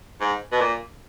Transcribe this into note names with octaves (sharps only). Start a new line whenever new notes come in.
G#2
B2
A#2